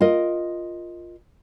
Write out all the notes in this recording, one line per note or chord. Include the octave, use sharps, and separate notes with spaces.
F4 A#4 D#5